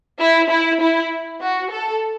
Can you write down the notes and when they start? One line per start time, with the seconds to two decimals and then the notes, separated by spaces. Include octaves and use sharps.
0.20 E4
0.50 E4
0.81 E4
1.41 F#4
1.71 A4